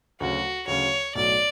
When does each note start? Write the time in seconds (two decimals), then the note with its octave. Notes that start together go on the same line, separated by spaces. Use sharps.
0.20 D2 C#3 F#3 F#4
0.67 D2 C#3 F#3 C#5
1.15 B1 A2 F#3 D5